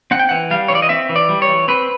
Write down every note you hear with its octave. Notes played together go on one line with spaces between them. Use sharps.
C4 F#5
G5
E3 F#5
G3 F5
E3 C#5
D5
D#5
C4 E5
E3
D5
G3
C#5
E3
C4 B4